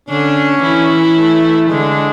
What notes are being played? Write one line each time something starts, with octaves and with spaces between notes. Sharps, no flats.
D3 C#4 D4
E3 E4
A3
D3 G#3 D4